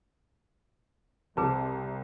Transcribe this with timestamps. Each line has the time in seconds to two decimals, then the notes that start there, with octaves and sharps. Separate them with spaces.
1.37 C2 C3 G#4 B4 A5